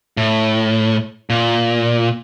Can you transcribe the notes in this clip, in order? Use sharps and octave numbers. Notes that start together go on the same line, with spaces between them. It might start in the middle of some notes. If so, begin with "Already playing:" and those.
A2
A#2